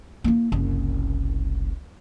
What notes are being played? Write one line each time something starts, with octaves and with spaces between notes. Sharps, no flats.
A#3 E4
F#1 C2